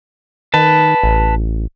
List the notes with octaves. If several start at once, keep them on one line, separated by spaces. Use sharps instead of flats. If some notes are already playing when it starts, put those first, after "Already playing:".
D#3 B4 A5
A1